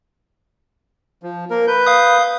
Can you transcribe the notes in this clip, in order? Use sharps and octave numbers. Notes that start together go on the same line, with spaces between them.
F3
A#3 A#4
B4 G6
F5 D#6